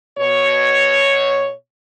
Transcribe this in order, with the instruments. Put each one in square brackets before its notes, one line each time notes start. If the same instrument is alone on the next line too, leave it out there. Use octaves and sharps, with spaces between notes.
[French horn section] B2 C#5